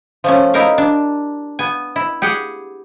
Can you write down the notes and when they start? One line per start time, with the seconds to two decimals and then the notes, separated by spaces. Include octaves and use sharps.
0.24 F3 A3 C#4
0.54 D#4 E4 G4 A#4 F5
0.78 D4
1.59 B3 G#5
1.96 E4
2.22 G4 G#4 F#5 G5